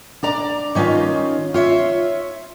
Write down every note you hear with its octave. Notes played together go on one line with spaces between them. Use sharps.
D4 D5 A#5
D#3 C#4 D#4 F4
F4 C#5 E5